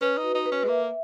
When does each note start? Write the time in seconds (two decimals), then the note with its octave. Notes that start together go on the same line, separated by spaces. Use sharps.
0.01 C#4 B4
0.18 D#4
0.23 F#4
0.35 D#4
0.46 B4
0.52 C#4
0.64 G#3
0.68 A#3 E5